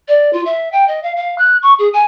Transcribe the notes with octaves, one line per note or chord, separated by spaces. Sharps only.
D5
F4
E5
G5
D#5
F5
F5
F#6
C#6
G#4
G#5